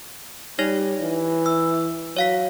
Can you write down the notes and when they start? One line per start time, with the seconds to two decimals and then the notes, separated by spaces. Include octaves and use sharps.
0.59 G3 D#4 C#5 A#6
1.01 E3
1.46 E6
2.17 F#3 C#5 F5 B6